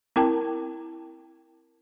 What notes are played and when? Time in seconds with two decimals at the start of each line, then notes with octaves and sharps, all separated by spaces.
0.16 C4 E4 A#4 G5 A5